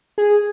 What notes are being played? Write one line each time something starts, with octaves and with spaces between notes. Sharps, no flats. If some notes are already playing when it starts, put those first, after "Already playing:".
G#4